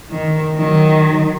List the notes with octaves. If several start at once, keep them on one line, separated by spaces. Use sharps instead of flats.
D#3
D#3 F#3